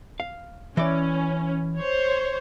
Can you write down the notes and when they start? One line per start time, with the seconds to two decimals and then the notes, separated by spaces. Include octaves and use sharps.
0.20 F5
0.77 E3 C#4 D5
1.77 C5 C#5